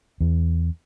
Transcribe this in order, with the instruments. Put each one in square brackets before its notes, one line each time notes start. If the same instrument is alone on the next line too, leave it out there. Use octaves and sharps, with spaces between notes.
[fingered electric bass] E2